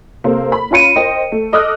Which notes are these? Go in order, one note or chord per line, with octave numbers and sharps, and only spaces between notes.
C3 A#3 A4 C5
B5
C#4 F4 B5 C#7 D#7
A#4 C5 D#5 G5
A3
A4 D#5 D6 D#6 F6 F#6